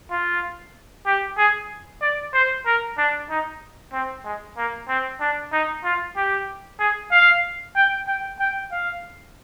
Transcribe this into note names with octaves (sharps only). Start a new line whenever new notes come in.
F4
G4
G#4
D5
C5
A#4
D4
D#4
C4
G#3
A#3
C4
D4
D#4
F4
G4
G#4
F5
G5
G5
G5
F5